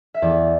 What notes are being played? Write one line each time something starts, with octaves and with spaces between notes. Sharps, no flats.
E5
E2 D5